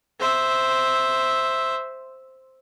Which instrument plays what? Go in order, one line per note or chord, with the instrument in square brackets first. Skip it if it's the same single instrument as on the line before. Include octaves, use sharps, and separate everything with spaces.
[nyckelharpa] C5 E5